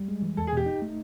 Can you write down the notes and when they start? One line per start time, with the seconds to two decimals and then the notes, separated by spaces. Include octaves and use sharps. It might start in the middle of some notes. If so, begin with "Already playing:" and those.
Already playing: G3
0.08 G#3
0.22 E3
0.37 E2 A4
0.47 G#4
0.53 B2 G4
0.66 D#4
0.82 A3